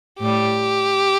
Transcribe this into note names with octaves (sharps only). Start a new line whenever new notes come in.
A2 G3 G4